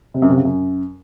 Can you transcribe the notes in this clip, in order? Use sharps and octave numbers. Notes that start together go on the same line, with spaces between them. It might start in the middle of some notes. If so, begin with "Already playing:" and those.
C3
F#2
C3
C#3
F#2